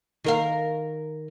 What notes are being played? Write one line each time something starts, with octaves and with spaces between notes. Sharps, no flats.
D#3 A#4 F5